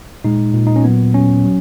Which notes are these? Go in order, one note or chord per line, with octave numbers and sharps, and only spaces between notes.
A#2 G#3 D#4
A#2 G#3
D#4
C#4
A#2 F#3 B3
A#2 F#3 C#4
F#3